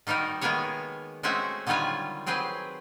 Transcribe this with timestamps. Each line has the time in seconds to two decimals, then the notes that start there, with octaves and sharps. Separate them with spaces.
0.07 D#3 G3 D#4 F#4 A#4
0.41 D#3 G#3 A#3 B3 G#4 C#5
1.23 G#3 A3 C4 C#4 F#4 E5
1.67 D3 D#3 F#3 G3 F4 G#5
2.26 F#3 C4 G#4 B4 C5